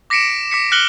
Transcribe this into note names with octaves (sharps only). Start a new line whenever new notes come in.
D6 A#6 B6 C#7 D7 E7
D6 B6 C#7
F6 F#6 A#6 C#7 F#7 G7